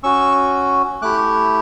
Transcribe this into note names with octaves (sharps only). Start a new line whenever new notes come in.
C#4 F#4 C#6 E6
A3 E4 G4 D6 F#6